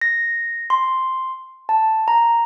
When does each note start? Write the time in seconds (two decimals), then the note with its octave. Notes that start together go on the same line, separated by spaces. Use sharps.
0.01 A#6
0.70 C6
1.69 A5
2.08 A#5